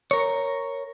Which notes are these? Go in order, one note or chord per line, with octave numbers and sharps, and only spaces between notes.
A#4 C#5